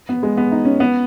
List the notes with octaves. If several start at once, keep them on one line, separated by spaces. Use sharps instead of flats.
B3
G#3
B3
D#4
C#4
B3